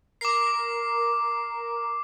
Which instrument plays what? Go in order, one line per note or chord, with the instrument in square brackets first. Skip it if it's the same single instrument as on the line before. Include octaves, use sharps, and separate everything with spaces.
[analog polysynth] A#4 [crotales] D6 C7